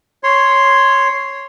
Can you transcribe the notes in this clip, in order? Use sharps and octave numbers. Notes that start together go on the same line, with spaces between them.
C#5 C6